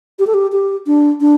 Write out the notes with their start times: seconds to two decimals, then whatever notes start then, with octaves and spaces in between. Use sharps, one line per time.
0.19 G4
0.27 A4
0.34 G4
0.52 G4
0.87 D4
1.21 D4